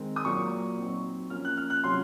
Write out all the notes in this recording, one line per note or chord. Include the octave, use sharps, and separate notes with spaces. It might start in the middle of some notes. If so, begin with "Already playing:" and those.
Already playing: D#3 G#3 C4
D#6
A#2 F#3 A#3 C#6
F#3 C4 D#4
F3 A#3 C#4 F6
F#6
F6
F#6
C3 F#3 C#4 F4 C6